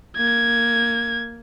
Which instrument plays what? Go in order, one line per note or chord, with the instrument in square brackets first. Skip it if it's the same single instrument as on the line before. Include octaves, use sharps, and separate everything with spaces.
[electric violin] A#3 G#6